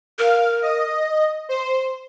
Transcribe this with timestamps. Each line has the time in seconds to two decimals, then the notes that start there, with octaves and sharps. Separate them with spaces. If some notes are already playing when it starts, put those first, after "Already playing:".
0.19 A#4 F5
0.62 D#5
1.49 C5